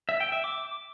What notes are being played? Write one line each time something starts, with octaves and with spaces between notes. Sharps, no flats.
E5
G5
E5
D6